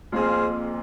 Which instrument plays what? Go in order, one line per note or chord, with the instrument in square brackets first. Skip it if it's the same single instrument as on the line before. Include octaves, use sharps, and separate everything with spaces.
[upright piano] F2 A#2 [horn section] C4 F4 G#4 F5